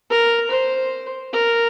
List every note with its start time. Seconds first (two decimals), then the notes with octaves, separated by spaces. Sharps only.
0.10 A#4
0.51 C5
1.33 A#4